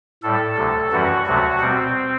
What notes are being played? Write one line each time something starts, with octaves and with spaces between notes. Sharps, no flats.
A2 G3 A4
D2 C3 F#3
F#2 E3 G3 F#4
D2 C3 F#3 A3 F#4
B2 G3 C4